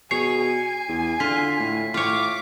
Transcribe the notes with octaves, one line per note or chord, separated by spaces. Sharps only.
B2 G#4 C#5 C7
G#5
E2
D3 F4 B6
A2
A2 F4 C#5 D6